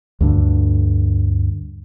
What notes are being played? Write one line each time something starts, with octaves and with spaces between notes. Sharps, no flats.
D2 G2 D3